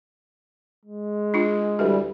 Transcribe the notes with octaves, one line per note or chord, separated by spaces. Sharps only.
G#3
D4 F4
D2 E3 G3 G4